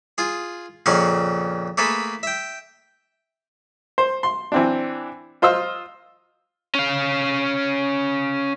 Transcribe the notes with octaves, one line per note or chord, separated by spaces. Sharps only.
F4 G#4
F2 A#2 C#3 F5 F#5 C#6
A3 A#3 G#4 A4 B4
E5 G5
C5
C6
E3 C4 D4
F4 C5 D#5 E6 F6
C#4 F5